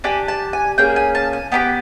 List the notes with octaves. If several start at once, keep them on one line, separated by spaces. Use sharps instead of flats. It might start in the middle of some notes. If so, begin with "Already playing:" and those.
D4 G4 G#5
A5
G#5
A#3 C#4 G#4 G5
G#5
A5
G#5
B3 D4 G4 G5